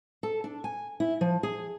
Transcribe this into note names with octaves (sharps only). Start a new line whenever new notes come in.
A4
D4
G#5
E4
F3
G#4